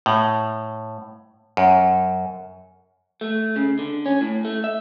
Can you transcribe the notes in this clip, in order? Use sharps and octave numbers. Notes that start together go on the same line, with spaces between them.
A2
F#2
A3
C#3
D3
C#4
A2
A3
E5